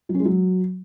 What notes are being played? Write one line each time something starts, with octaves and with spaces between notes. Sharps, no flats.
F#3
C#4
G#3
F#3